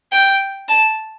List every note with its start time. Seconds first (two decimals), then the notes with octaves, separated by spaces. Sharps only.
0.12 G5
0.68 A5